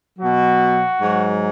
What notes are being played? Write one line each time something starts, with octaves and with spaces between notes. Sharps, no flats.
B2 F#3 F#4
G#2 F#3